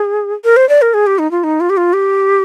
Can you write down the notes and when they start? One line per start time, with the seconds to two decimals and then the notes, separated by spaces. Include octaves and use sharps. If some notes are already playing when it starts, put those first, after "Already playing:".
Already playing: G#4
0.44 A#4
0.57 C5
0.69 D5
0.82 A#4
0.94 G#4
1.07 G4
1.19 D#4
1.31 F4
1.44 D#4
1.60 F4
1.70 G4
1.77 F4
1.93 G4